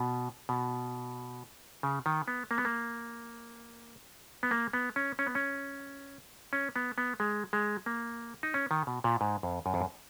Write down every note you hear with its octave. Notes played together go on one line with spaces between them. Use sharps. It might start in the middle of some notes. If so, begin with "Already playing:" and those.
Already playing: B2
B2
C#3
D#3
B3
A#3
B3
A#3
B3
A#3
B3
C#4
C#4
B3
C#4
C#4
B3
B3
G#3
G#3
A#3
D#4
C#4
D#3
B2
A#2
G#2
F2
F#2
F2
F#2